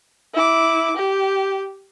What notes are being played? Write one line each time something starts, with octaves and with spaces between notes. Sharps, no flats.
E4 D6
G4